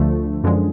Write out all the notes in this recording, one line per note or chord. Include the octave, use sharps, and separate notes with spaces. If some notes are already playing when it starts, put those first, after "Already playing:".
Already playing: D2 D3 F3 A3
F#2 D3 F3 G#3